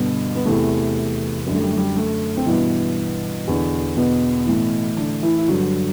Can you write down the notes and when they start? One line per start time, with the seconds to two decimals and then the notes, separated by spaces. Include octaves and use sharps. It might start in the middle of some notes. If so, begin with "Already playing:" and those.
Already playing: G2 B2 D3 B3
0.36 B3
0.46 E2 C3 E3 A3
1.46 F#2 D3 G3
1.55 A3
1.62 G3
1.70 A3
1.78 G3
1.97 A3
2.37 C4
2.46 G2 B2 E3 B3
3.48 E2 D3
3.97 B2 B3
4.47 A2 E3
4.97 D3 D4
5.23 E3 E4
5.39 E4
5.48 G2 D3 F#3 F#4